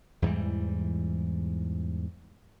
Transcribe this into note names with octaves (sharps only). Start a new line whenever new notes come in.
E2 G#2 E3 G3